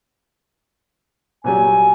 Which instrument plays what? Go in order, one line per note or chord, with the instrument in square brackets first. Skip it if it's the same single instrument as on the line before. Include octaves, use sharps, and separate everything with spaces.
[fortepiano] A#2 F#3 G3 [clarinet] G#5